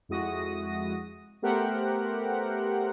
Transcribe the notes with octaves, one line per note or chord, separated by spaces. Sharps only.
F2 G#3 E4 F#4 D#6 A#6
A3 B3 G4 A#4 C5 F#5